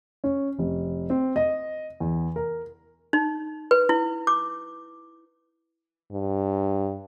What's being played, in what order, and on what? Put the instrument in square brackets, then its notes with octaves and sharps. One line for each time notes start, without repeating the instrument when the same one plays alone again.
[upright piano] C#4
F1
C4
D#5
E2
A#4
[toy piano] D#4
B4
E4
D6
[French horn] G2